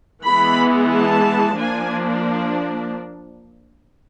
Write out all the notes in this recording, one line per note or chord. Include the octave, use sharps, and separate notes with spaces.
E3 G#3 B3 B5
A5
F3 A#3 D4 G#5